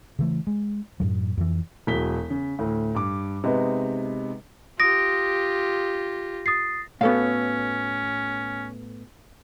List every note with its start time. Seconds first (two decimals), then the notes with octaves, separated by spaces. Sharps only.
0.19 C#3 E3 A3
0.47 G#3
1.00 F#2 A2 F#3
1.37 F2 E3
1.87 E1 F#3 B6 G7
2.30 C#3
2.59 D2 A2
2.95 G2 D6
3.44 C3 G#3 B3 D#4 B4
4.80 F4 G4 D#6 A#6 D7
6.46 D#6 A6 C7
7.01 A2 B3 C#4 F#4 A4 F5